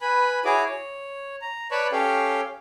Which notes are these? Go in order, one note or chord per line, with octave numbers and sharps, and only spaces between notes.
B4 G#5 B5
E4 F#4 G#4 C#5 G#5 D6
C#5
A#5
B4 C#5 D5 A5 B5 C#6
C#4 G4 A4 C#5 F5 G5